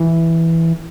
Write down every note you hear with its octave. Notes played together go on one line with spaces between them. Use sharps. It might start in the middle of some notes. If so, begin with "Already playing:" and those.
Already playing: E3